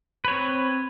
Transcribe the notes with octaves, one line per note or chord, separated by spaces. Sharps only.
C4 B4 C#5